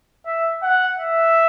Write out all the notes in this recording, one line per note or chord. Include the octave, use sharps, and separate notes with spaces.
E5
F#5
E5